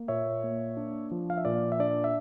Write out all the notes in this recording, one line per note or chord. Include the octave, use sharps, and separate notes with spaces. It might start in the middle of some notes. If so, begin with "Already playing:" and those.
Already playing: A#3
A#2 C#5 E5
A#3
D4
F3
F5
E5
A#2 D5
E5
D4 D5
E5